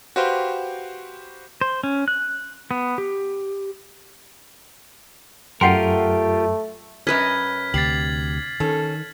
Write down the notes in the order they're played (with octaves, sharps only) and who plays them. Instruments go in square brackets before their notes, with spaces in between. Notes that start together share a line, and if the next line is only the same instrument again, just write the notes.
[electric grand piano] F#4 G4 B4 C5 F5 G5
[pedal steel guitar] C5
C#4
F#6
B3
G4
[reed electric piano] F#2 [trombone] A3 [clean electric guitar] F4 G4 A#4 [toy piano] F#5 G5 C6
[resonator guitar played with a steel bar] F#2 C#4 [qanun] B4 D#5 [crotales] F6 G#6 B6
[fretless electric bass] D2 C3 [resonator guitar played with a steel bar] G4 [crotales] A6 C7 F#7
[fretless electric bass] D#3 [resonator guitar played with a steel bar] C#4 A4